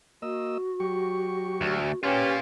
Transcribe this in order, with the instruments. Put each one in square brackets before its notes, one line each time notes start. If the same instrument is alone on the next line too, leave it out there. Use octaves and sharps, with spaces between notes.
[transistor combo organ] A#3 D#5 E6 [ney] F#4
[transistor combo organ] F#3 G4 C#6
[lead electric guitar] D2
[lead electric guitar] A#3 F4 [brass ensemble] C#4 G4 [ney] B4